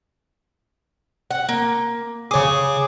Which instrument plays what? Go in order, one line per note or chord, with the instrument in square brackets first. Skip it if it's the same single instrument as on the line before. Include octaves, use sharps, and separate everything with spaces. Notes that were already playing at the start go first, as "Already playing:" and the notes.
[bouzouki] F#5
A#3
[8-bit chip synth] C#3 D6 [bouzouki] G#4 C#5